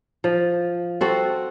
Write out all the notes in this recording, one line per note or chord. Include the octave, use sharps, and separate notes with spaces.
F3
C4 F#4 A4